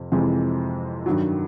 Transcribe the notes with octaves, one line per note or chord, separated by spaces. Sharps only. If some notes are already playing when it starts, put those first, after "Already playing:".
Already playing: F2 C3
F2 C3 E3 G#3
G2 D#3 F#3